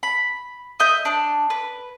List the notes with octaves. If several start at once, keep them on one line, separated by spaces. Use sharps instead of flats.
B5
D#5 E5 G6
D4
B4